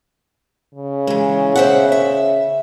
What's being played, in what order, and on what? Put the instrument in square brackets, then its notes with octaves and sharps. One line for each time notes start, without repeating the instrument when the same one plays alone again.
[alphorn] C#3
[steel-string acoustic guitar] E3 G#3
C5 E5 F#5
E5